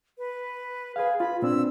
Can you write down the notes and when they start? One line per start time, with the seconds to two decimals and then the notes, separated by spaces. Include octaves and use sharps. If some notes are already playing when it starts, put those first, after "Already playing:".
0.18 B4
0.96 G#4 B4 F5
1.20 F4 B5
1.42 A#2 C4 D4 E6